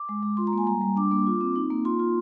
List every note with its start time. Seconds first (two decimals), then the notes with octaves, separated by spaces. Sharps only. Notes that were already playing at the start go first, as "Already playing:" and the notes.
Already playing: D6
0.09 G#3
0.23 G#3
0.37 F4 C6
0.47 A#5
0.53 A#3 G#5
0.67 G3 A#5
0.81 G3
0.96 D4 D6
1.11 A#3
1.27 F4
1.41 C4
1.56 D#4
1.70 A#3
1.85 F4 C6
1.99 F4